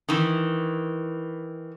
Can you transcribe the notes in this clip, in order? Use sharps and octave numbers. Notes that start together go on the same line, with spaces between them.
D#3 E3